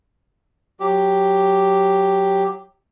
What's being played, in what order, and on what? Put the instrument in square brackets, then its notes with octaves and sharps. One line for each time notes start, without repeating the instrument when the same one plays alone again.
[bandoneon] F#3 G4